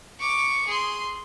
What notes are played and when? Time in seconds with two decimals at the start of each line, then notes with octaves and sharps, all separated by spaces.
0.20 C#6 D6
0.68 G#4 C6